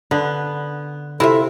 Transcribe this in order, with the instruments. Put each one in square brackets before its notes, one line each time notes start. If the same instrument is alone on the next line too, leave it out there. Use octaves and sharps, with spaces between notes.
[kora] D3 [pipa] B3
[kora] C3 [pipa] E4 F4 E5 [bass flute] A4